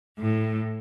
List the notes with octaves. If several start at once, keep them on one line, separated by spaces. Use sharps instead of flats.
A2